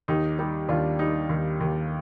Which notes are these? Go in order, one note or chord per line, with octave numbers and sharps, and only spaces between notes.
D#2 D#4 G4
G3 D#4 G4
D#2 D4 F4
G3 D#4 G4
D#2
D#2